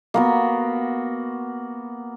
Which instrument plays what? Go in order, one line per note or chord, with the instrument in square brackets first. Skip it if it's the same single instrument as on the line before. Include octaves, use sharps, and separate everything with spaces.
[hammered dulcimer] A#3 B3 F#4